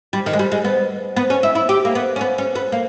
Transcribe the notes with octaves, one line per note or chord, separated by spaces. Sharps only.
G3
D#3
G#3
G3
G#3
B3
B3
C#4
E4
E4
G4
A#3
B3
C#4
B3
C#4
B3
A#3